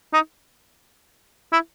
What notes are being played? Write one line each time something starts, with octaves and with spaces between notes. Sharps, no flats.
D#4
E4